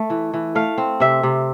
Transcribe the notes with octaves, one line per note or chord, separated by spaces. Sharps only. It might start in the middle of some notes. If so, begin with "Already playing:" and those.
Already playing: A3
E3
E3
A3 F5
C4
C3 E5
C3